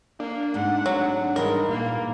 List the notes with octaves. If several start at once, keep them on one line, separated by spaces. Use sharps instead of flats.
A#3 D4
G#2 C3 A3 F#5
F#3
G#2 E3 G3 G#3 A#4
A#2 A#3